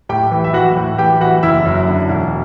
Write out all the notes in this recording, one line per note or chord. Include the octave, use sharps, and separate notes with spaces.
A2 G4 G5
E3
E5
E3 F#4 F#5
A2
E3 G4 G5
E3 F#4 F#5
F#1 E4 E5
F#2
D3
E1